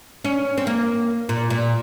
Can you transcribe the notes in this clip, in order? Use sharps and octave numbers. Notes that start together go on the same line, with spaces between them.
C#4
C4
A#3
A#2
A#2